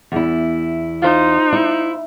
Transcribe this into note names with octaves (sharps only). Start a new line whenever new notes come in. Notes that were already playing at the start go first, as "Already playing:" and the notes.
E2 E4
D#4 F4 C5
E4